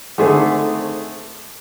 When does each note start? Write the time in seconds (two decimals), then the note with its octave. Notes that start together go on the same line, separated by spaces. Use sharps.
0.18 D3 D#3 A3 C4 G#4